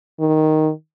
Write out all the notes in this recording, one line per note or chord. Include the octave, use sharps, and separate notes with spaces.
D#3